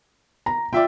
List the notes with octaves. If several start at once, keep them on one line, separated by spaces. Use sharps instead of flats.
A#5
F4 D5 E5 G5